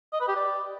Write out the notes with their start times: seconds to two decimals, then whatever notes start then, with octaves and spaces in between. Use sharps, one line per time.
0.13 D#5
0.21 B4
0.28 G4
0.36 D5